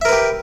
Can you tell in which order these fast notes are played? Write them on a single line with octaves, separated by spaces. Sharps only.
E5 A#4 B4 G4